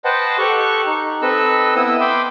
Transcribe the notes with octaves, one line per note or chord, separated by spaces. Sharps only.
B4 C5 D#5 F#5 G5 A5
G4 A4 C#6 F#6
D#4
C4 A4 B4 D#5 E6
B3 E4 D#6 E6
G5 B5 C6 D6